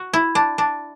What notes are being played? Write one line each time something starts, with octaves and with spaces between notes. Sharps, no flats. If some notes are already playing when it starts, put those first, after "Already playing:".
Already playing: F#4
E4
D4
D4